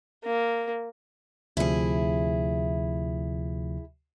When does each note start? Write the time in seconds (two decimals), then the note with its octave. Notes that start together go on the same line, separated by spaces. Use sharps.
0.24 A#3
1.57 D2 C3 F3 E4 G#4